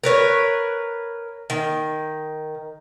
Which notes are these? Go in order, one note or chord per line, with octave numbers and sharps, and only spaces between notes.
A#4 B4 C#5
D#3